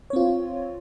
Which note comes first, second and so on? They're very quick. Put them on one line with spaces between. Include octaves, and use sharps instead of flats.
C#5 C4 F4